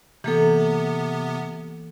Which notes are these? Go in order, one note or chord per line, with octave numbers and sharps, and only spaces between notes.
C3 E3 A#3 B3 A4